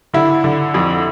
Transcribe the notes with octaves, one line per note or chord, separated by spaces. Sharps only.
D3 E4
D3
F2